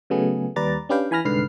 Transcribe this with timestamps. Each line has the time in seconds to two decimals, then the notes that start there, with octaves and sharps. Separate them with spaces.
0.10 C#3 F#3 A3 B3 G#4
0.56 D#2 G3 B4 D5 A#5 A6
0.89 C#4 D4 G4 B4 F5 G5
1.11 E3 G#5 B5 F6 A#6
1.25 C2 G#2 D3 B4 F6 C7